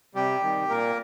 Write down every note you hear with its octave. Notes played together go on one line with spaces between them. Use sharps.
C3 G3 G4
D#3 G3
A#2 A#3 A#4